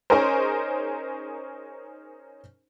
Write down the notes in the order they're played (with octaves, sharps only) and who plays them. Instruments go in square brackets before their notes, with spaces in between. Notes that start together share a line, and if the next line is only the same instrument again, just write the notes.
[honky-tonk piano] C#4 D#4 G#4 A#4 C5